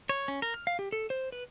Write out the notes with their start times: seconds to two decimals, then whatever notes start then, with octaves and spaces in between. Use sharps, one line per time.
0.09 C#5
0.28 C#4
0.42 A#4
0.54 F6
0.67 F5
0.79 G4
0.92 A4
1.10 C5
1.32 B4